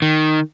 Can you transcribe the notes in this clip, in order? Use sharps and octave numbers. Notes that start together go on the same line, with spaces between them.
D#3